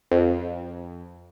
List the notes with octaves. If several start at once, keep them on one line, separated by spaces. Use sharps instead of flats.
F2